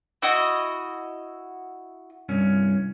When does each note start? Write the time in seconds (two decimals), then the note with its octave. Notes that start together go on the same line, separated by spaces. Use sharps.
0.22 E4 F#4 D#5
2.29 C2 G2 C#4